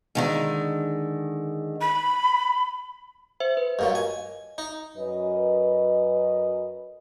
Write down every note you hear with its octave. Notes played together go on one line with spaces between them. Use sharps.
D3 D#3 G#3
B5
C5 E5
B4
G2 A#2 F#3 D#5
G#5
D#4
F#2 B4 D#5